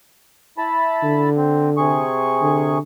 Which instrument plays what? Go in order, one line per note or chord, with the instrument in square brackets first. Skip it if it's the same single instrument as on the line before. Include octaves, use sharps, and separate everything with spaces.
[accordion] E4 A5 B5
[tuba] D3
[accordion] C4
C3 G#4 C#6
[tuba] D3